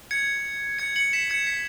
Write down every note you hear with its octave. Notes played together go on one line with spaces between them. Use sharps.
G#6 C#7
G#6 C#7
C#7 F#7
B6 E7
G#6 C#7
B6